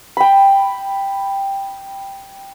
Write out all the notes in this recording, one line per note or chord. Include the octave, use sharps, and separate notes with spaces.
G5 B5